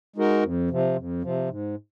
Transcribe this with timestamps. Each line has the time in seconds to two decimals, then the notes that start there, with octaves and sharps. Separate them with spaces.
0.16 G#3 D#4 F#4 A#4
0.43 F2
0.70 C3 F3
0.96 F2
1.22 C3 F3
1.49 G#2